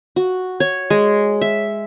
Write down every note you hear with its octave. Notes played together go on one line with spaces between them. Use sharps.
F#4
C#5
G#3
E5